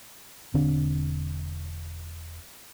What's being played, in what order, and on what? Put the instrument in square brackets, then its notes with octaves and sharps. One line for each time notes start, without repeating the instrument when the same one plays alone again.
[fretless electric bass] E1 D3 C4 D4